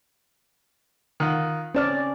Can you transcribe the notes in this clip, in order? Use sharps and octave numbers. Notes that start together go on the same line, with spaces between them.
D#3 F4 F#5
C4 C#4 D5 A5 F6